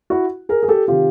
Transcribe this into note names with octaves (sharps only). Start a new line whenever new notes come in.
E4 F#4
G#4 A#4
G#4
G4 A4
C3 D#3 F4 G4